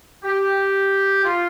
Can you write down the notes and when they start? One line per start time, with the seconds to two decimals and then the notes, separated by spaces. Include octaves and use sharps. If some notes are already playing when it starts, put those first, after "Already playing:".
0.24 G4
1.24 F4